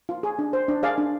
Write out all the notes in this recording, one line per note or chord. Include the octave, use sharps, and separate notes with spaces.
F4
G#4
D4
C5
D4
G#4 D5 F5
D4